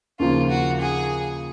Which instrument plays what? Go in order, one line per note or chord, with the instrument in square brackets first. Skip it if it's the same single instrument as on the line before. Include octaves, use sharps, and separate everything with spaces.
[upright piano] D#2 C#3 F3 A#3 [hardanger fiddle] F4
[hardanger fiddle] F#4
G#4